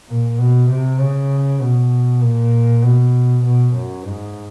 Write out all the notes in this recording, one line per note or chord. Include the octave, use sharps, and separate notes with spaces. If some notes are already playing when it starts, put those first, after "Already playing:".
A#2
B2
C3
C#3
B2
A#2
B2
B2
F#2
G#2